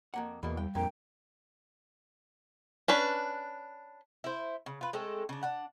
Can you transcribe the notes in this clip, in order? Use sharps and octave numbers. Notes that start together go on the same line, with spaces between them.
F2 A#3 F#5
E2 B2 A#3 B5
G3 G5
F2 A#2 D4 A#4 G5
C#4 D4 B4
E4 C5
C#3
F4 B4
G#3 A3 C4 A4
C#3 D4
D4 F#5